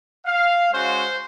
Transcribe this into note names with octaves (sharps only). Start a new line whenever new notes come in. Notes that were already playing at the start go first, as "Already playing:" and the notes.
F5
G#3 C#4 F#4 C5